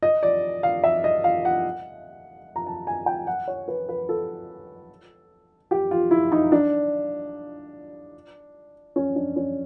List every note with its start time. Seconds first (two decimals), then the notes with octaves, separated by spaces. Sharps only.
0.03 D#5
0.23 D5
0.63 F5
0.84 E5
1.04 D#5
1.24 F5
1.45 F#5
2.56 A#5
2.66 A5
2.87 G#5
3.06 G5
3.27 F#5
3.48 C#5
3.68 B4
3.89 B4
4.09 A4
5.71 G4
5.91 F4
6.11 E4
6.32 D#4
6.52 D4
8.96 C#4
9.16 D4
9.36 C#4